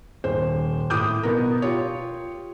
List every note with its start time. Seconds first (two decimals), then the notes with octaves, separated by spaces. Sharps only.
0.24 D#1 C5
0.90 A2 D6 D#6 G6
1.23 B2 B3 A#4
1.62 F4 G4 C#5